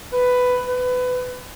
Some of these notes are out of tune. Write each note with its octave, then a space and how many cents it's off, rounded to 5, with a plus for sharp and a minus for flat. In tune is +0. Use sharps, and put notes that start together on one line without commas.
B4 +10
B4 +25